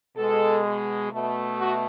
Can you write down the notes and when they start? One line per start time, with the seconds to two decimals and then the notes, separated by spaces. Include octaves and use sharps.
0.16 B2 G#3 A4
1.11 B2 A3
1.58 F#4